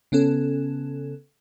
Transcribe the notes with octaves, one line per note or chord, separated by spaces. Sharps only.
C#3 B3 C#4 A4